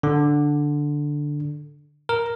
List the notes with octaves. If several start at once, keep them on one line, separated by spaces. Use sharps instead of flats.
D3
A#4